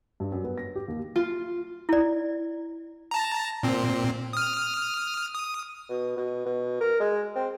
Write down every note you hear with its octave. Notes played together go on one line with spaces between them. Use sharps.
G2
F#2
B3
A#6
G4
D#2
F4
E4 D5
A5 A#5
A#2 C4
D#6 F6
D#6
B2
B2
B2
A#4
G#3
C4